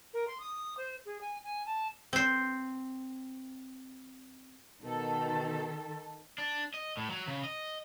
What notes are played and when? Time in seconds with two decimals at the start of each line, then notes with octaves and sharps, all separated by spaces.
0.14 A#4
0.28 C6
0.40 D#6
0.77 C5
1.06 G#4
1.21 G#5
1.44 G#5
1.66 A5
2.13 C4 C5
4.82 B2 D#3 A4
6.38 D4
6.74 D#5
6.97 A2
7.10 F#3
7.28 C#3
7.44 D#5